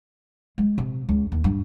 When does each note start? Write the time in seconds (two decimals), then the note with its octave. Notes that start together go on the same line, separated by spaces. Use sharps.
0.58 G#3
0.78 C3
1.09 C#2
1.32 D#2
1.44 G2